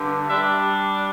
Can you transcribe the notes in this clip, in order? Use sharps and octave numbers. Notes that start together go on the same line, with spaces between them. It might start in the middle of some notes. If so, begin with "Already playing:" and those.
Already playing: G2 D3
G3 D4 E5